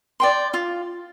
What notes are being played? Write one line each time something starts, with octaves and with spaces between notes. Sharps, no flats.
D5 G5 C6
F4